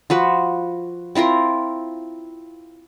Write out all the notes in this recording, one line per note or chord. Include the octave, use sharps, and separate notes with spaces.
F3 F#4 B4
C4 E4 F4 A#4